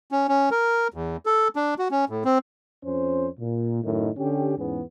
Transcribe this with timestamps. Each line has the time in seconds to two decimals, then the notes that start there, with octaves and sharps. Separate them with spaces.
0.11 C#4
0.28 C#4
0.51 A#4
0.94 E2
1.26 A4
1.56 D4
1.79 F#4
1.91 C#4
2.09 A2
2.25 C4
2.84 F2 C#4 C5
3.40 A#2
3.84 F#2 A2 D#3
4.17 D3 C#4 G4
4.57 E2 G#2 B3 C#4